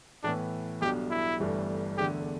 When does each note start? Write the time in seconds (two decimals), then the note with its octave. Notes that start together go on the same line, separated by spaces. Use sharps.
0.23 A2 E3 B3 D4
0.82 B1 B2 G3 D4 G4
1.11 E4
1.40 G1 G2 E3 A3 D4
1.98 E1 E2 D3 A3 D4 G4